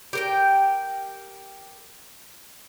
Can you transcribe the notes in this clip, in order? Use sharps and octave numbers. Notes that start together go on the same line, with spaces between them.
G4 A#4 G5